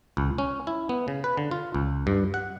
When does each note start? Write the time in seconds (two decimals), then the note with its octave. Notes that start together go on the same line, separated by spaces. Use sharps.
0.17 C#2
0.38 C#4
0.67 E4
0.89 B3
1.08 C#3
1.24 B4
1.37 D3
1.51 F4
1.74 C#2
2.07 G2
2.34 F#5